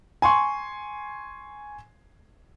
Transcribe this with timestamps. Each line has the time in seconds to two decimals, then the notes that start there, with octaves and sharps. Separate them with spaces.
0.22 G#5 C6 C#6